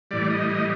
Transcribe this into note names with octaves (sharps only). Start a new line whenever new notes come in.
A2 E3 G3 D5
D#5
D#5